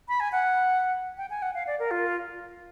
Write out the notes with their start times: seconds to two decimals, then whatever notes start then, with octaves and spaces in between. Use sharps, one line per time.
0.08 B5
0.20 G#5
0.32 F#5
1.18 G5
1.30 G#5
1.42 F#5
1.55 F5
1.67 D5
1.79 A#4
1.91 F4